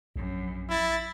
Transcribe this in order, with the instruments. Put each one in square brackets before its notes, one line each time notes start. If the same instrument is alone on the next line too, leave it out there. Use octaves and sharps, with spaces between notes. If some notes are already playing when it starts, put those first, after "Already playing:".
[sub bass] A#1 [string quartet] F#2
[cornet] E4 [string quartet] A6